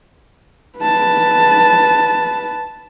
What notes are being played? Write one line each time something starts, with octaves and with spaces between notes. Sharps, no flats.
B4 A5